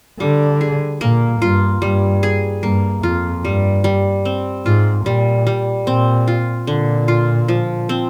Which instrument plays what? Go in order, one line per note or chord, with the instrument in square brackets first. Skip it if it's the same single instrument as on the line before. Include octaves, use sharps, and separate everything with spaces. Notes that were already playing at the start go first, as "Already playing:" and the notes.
[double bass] D3 [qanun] G3
[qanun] G#4
[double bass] A#2 [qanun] A#3
[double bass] G2 [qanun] F4
[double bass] G2 [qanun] G3
[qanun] G#4
[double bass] G2 [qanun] A#3
[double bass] F2 [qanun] F4
[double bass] G2 [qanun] G3
[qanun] G3
C4
[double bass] G#2 [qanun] F4
[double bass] A#2 [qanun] G3
[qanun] G3
[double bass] A#2 [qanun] C4
[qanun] F4
[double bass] A#2 [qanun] D3
[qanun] F4
F3
C4